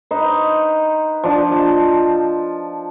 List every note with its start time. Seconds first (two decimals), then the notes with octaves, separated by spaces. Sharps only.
0.11 D#4 B4 C5
1.24 F3 D4
1.51 D#5 A5